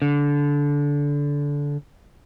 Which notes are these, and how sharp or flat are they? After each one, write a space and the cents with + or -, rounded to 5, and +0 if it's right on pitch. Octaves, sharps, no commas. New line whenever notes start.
D3 -20